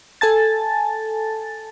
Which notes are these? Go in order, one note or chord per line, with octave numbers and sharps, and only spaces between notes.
A4 G#5 A5 A6